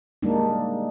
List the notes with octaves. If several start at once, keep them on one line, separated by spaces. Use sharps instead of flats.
G3 G#3 A#3 D4 D#4